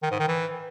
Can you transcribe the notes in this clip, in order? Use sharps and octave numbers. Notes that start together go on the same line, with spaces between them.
D#3
G#2
D#3
E3